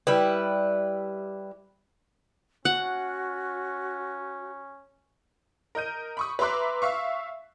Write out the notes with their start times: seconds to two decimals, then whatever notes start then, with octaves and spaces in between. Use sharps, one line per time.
0.07 G3 E4 B4
2.65 C#4 F#4 F#5
5.75 A#4 D#5 G6 D#7
6.17 B5 C#6 D#6
6.39 B4 E5 A#5 C6 D6 F#6
6.82 E5 F5 C#6